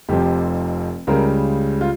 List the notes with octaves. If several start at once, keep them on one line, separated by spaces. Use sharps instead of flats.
F1 F2 C3 F3 G4
C#2 C#3 G3 A#4
F4